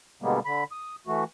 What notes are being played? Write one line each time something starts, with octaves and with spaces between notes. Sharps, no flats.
B2 D3 G3 G#3 A#3 B3
D3 B5
D#6
E3 A3 F#4